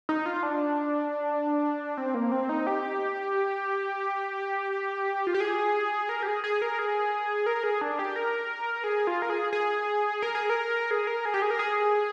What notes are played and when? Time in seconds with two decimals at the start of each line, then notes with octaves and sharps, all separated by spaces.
0.09 D#4
0.26 F4
0.43 D4
1.97 C4
2.14 A#3
2.32 C4
2.49 D#4
2.67 G4
5.27 F4
5.34 G4
5.40 G#4
6.09 A#4
6.23 G4
6.27 G#4
6.44 G#4
6.62 A#4
6.79 G#4
7.46 A#4
7.64 G#4
7.81 D4
7.99 G4
8.16 A#4
8.84 G#4
9.07 F4
9.22 A#4
9.30 G#4
9.53 G#4
10.22 A#4
10.35 G#4
10.50 A#4
10.91 G#4
11.07 A#4
11.25 G#4
11.34 G4
11.42 G#4
11.51 A#4
11.59 G#4